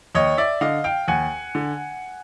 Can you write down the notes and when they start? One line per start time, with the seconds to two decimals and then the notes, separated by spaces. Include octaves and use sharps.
0.15 D#2 C#5 D#5
0.37 D5 E5
0.61 D3 D#5 F5
0.84 F5 G5
1.08 D#2 F#5 G#5
1.55 D3